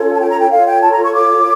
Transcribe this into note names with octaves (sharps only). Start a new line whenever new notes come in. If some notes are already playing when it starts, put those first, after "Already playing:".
Already playing: C#4 F4 A4 C#5
A5
G5
A#5
G5
F4 A4 C#5 F5
G5
A5
A#5
C#6
D6